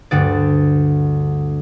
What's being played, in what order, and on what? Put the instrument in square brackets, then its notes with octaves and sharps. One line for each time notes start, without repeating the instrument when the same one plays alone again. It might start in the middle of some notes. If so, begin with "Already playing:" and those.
[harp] D2 G2 D3 D5